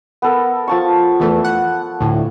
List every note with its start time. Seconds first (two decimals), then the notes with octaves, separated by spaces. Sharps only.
0.22 B3 A4 A#4
0.67 F3 A5 C#6
1.20 E2 E3 A3
1.45 F#5
2.01 D2 A2